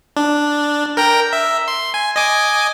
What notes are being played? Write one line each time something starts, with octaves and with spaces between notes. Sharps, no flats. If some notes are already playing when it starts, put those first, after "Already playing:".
D4
A#4 G5 A#5
E5
C6
G#5
D#5 G#5 D6